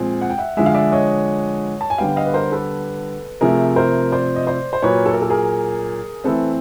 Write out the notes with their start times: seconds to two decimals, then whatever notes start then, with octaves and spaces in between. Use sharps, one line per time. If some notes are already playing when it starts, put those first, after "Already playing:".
Already playing: A#2 F3 G#3 C4
0.21 F#5
0.30 G5
0.38 E5 F#5
0.57 D3 F3 G#3 E5
0.66 F5
0.74 D5 E5
0.92 C#5 D#5
1.81 A5
1.90 G#5
1.98 D3 G3 B3 F5 G5
2.16 D#5 F5
2.26 B4
2.34 A#4 C5
2.52 A4 B4
3.41 C3 F3 A3 G#4 A#4
3.76 A#4 C5
4.12 C5 D5
4.36 D#5
4.47 C5 D5
4.73 C5
4.82 A#2 F#3 A#3 B4 C#5
5.06 A4
5.14 A#4
5.22 A4
5.30 G#4 A#4
6.24 E3 A3 C4 A4 B4